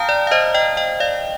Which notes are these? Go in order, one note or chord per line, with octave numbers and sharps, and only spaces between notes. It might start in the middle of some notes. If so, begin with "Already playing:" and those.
Already playing: F5 G5 A5 A#5 D#6 F6 G6
D5
F5
C5 D#5
D#5 G5
D#5 G5
D5 F5